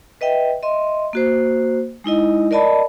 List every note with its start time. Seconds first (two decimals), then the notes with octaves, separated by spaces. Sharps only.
0.21 B4 D#5 E5 G5
0.63 D#5 E5 C6
1.13 A#3 F#4 C5
2.04 G#3 D#4 E4 D#5
2.51 A#4 D5 D#5 A5 B5